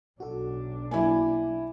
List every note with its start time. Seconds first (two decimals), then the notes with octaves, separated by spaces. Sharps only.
0.20 B1 D4 F#4 A4
0.91 F#3 A#3 E4 G#5